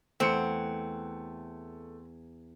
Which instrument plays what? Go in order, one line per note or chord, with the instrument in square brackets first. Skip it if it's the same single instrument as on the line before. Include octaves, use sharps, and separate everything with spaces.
[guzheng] E2 [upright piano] A3 C#7 [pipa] C4